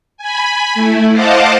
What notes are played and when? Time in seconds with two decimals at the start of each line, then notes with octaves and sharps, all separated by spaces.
0.17 G#5 B5
0.74 A3 E4
1.13 C5 D#5 F5 F#5 A5 D6